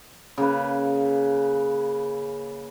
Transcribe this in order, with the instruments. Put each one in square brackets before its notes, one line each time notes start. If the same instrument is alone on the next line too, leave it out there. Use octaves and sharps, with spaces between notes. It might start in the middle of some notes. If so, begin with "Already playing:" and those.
[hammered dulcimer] C#3 A#3 B4